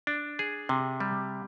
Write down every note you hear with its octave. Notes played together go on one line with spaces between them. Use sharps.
D4
G#4
C3
G3